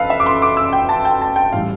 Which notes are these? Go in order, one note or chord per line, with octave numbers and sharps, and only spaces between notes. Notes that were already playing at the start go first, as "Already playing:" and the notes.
Already playing: F1 F2 A4 B4 F5
E5
D6
C6
D6
E6
G5
A5
G5
A5
G5
A2 E3 G3 F5